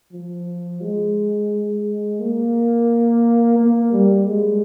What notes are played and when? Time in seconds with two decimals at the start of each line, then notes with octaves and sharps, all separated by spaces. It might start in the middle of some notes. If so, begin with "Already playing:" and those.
0.13 F3
0.81 G#3
2.20 A#3
3.58 A#3
3.92 G3
4.27 G#3